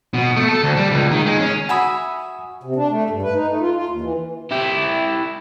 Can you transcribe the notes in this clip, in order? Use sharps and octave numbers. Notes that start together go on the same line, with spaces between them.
B2
A3
A4
D2
G3
C#2
D#3
G#3
C#4
F#4 E5 G#5 B5 D#6
C3
D4
A3
G2
B4
D#4
A3
F4
F4
D#2
E3
E4 G4